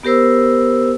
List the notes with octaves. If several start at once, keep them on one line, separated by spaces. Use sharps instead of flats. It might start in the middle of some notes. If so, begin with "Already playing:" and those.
B3 G4 A#4 C5 E6